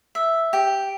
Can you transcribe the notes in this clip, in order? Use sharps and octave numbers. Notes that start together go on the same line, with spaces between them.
E5
G4